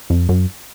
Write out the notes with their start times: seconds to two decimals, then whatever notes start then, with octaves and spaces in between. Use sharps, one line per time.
0.10 F2
0.29 F#2